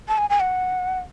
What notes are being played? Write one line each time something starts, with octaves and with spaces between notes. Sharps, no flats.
A5
G#5
G#5
F#5